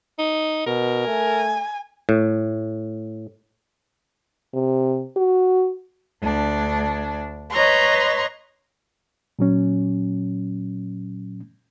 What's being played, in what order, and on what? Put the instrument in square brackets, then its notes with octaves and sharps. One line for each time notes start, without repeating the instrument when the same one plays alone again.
[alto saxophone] D#4
[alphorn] B2 [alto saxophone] A#4
[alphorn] A3 [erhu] G#5
[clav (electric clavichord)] A2
[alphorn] C3
F#4
[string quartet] D2 D4
B4 C#5 D#5 A#5 C6 C#6
[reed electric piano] A#2 F#3 C#4